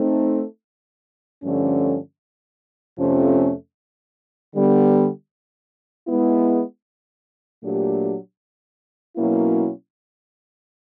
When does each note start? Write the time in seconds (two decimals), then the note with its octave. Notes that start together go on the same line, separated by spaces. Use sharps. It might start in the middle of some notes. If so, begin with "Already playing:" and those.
Already playing: A3 C4 D#4
1.43 G2 D3 F3 A3 C#4
2.98 F2 C3 F3 A3 C#4
4.54 D3 G3 B3
6.08 G#3 B3 E4
7.63 A#2 F#3 A3 D4 G4
9.17 B2 F#3 A#3 C#4 E4